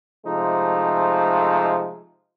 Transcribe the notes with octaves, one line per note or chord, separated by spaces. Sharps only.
C3 F3 G#3 A3 D#4